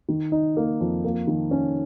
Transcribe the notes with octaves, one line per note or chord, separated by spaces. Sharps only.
D#3
D#4
A#3
F2
A#3
D#3
C#4